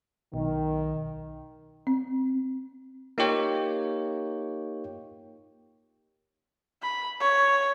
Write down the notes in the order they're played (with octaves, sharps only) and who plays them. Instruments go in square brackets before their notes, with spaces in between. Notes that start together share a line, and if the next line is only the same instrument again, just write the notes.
[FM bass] B1 [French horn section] D#3
[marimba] C4
[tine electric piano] A#3 D#4 F4 G4 C#5 G5
[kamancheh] B5
C#5